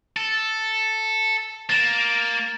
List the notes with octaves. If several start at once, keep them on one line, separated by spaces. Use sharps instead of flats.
A4
A#3 A6 E7